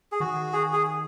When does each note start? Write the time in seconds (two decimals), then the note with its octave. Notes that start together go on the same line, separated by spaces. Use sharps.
0.12 G#4
0.20 D#3 F#4
0.53 G#4
0.73 G#4